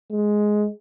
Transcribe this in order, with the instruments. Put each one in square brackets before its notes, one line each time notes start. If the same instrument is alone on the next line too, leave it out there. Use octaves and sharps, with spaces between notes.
[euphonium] G#3